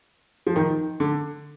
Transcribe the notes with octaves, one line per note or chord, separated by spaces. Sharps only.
F3
D#3
D3